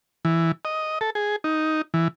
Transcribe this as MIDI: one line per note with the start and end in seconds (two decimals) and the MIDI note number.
0.25 0.52 52
0.65 0.99 75
1.01 1.10 69
1.15 1.36 68
1.44 1.82 63
1.94 2.08 52